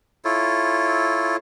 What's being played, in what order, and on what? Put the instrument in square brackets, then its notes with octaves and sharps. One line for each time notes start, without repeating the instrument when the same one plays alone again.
[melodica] E4 F4 A4 C#5